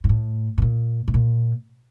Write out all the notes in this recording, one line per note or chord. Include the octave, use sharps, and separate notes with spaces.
G#2
A2
B2
A#2
A2
A#2